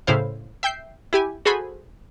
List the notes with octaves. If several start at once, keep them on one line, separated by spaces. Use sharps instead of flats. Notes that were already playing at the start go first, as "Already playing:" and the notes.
A2 C#3 E4 C5 F5
E5 G5 G6 C7
E4 G4 G#5
F#4 G#4 A4 C5 G#5 B5